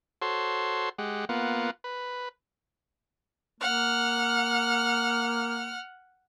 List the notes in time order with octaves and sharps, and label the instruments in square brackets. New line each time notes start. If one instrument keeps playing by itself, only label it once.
[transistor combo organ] F#4 A4 C5 C#5 C6
G#3 G4 F#5
A#3 B3 F4 F#5
B4
[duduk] A#3 [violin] F#5 F6